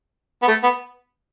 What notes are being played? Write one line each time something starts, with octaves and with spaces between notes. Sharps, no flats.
B3
A3
B3